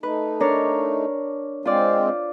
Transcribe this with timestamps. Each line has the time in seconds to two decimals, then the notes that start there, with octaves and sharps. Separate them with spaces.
0.03 A3 D#4 B4
0.40 D4 A#4 C#5
1.65 G#3 C4 F4 C5 D5